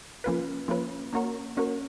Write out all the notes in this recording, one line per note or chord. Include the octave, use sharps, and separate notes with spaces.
F3 A#3 C#4 F4 B4
F3 A#3 C#4 F4 B4
A#3 C#4 F#4 A#4 C#5
A#3 C#4 F#4 A#4 C#5